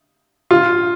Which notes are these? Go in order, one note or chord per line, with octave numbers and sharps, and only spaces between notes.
F4